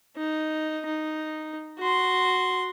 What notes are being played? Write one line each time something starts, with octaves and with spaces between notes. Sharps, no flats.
D#4
D#4
F#4 C6